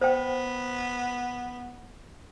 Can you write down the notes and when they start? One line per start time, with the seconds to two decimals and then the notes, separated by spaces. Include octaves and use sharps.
0.01 B3 C5 G5